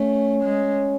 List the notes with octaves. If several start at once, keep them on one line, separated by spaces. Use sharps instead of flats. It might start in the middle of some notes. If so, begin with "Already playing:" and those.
Already playing: A3 C#4
G#3